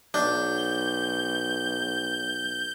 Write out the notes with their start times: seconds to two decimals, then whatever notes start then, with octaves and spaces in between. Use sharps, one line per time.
0.14 B1 D4 G6